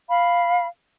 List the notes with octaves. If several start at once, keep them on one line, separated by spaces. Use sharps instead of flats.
F5 B5